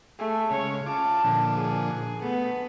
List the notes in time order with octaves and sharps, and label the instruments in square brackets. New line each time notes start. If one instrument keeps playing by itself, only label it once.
[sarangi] A3 [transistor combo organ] G#4
[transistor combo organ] C#3 G#3 [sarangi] C#5
[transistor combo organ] F4 D6 [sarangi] A5
[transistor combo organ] A#2 D3 F3
[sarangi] G#4
[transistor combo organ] A3 [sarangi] B3